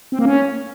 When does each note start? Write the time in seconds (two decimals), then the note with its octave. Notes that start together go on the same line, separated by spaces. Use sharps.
0.12 C4
0.19 A#3
0.25 C#4